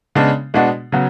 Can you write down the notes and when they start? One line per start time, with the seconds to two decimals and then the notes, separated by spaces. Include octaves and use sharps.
0.15 C#3 G#3 B3 D4
0.54 B2 G#3 B3 D4 F#4
0.92 C#3 F#3 B3 F#4